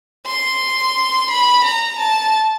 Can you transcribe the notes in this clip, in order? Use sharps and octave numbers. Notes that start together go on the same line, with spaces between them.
C6
B5
A#5
A5